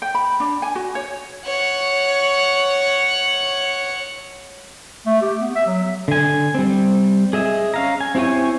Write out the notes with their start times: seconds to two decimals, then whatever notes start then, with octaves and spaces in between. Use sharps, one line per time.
0.02 G5
0.15 B5
0.40 D4
0.62 G#5
0.75 F#4
0.95 C#5
1.45 C#5 F#5
5.06 A3
5.22 G4
5.41 B3
5.55 E5
5.67 F#3
6.08 D3 G#5
6.55 G3 C4
7.33 G#4 D#5 E5
7.74 C#4 F5 A#5
8.01 G#5
8.15 C4 E4 G4 C#5 G#5